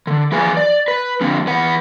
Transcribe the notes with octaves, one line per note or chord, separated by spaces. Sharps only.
D3
F3 G#4 B4 G#5
D5
B4
D3 F3 C4
E2 B4 F#5